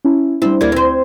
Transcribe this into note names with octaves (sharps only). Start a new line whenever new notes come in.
C#4 E4
G3 C4 D4 E4
D2 G3 A#3 E4 G#6
C4 C5